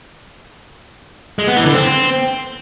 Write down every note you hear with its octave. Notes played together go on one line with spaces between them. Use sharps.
G#3
B3
E3
D3
C4